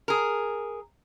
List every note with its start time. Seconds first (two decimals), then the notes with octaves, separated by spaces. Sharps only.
0.08 G#4 A#4